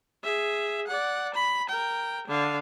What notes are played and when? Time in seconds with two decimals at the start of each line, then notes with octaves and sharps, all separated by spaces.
0.24 G#4 E5
0.87 D5 F#5
1.34 B5
1.69 A#4 G5
2.27 D3 F5